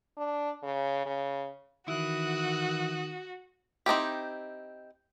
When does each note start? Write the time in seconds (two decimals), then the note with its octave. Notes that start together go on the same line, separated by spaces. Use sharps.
0.17 D4
0.63 C#3
1.06 C#3
1.88 D#3 E3 E4 F#4 D#6 F#6
3.86 C4 D#4 E4 G4